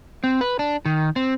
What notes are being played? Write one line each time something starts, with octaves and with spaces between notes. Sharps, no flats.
C4
B4
D4
D#3
C4